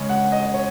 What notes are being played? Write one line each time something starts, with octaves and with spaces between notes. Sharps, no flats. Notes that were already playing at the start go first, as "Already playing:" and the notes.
Already playing: C#3 G#3 C#4
F#5
D#5
C#5